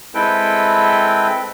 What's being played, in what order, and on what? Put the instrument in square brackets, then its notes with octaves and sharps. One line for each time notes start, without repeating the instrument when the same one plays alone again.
[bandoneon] G#3 C4 E4 A4 B4 G5